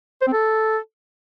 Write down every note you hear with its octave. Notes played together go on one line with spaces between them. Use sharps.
C5
C4
A4